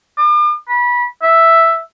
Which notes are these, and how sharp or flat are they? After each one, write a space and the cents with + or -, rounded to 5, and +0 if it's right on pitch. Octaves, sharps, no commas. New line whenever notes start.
D6 +45
B5 -25
E5 +0